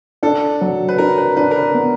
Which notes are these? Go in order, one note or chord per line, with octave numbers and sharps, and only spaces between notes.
D4 A4
F#3
B4
D4 A#4
B4
D4 B4
A#4
B4
B3